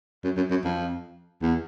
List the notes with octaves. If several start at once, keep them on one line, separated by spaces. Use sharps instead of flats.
F#2
F#2
F#2
F2
E2